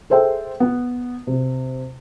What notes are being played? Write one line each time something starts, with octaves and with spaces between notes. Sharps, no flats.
G#4 A4 C5 E5 G5
B3
C3